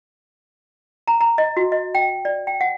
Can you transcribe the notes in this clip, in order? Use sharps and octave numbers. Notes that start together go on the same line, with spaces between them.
A#5
A#5
D#5
F#4
D#5
G5
D5
G5
F#5